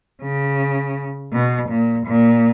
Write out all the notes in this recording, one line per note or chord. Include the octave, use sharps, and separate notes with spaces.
C#3
B2
A#2
A#2